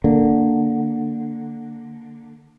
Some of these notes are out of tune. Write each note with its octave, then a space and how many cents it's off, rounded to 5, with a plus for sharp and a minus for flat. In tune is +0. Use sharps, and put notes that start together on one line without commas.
D3 +0 A#3 -10